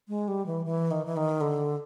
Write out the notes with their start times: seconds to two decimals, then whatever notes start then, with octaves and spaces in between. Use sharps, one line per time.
0.08 G#3
0.28 G3
0.46 E3
0.66 E3
0.91 D#3
1.06 E3
1.17 D#3
1.41 D3